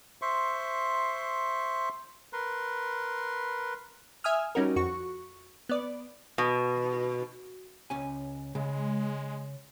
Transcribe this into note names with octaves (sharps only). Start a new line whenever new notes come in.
C5 E5 C6 C#6
A#4 B4 C6
E5 G#5 D#6 F6
G3 C#4 D#4 F#4 A#4
F2 F#4 C#6
B3 D5
B2
C#2 C#4 G#5
C#3 G#3